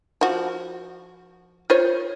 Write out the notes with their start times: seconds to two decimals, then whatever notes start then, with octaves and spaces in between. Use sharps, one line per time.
0.21 F3 F#4
1.70 F4 C5 C#5